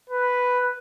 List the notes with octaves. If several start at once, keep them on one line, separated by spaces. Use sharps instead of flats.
B4